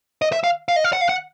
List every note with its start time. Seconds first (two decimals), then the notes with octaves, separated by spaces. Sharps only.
0.22 D#5
0.32 E5
0.44 F5
0.68 F5
0.76 D#5
0.84 F5
0.93 F#5
1.01 F5
1.09 F#5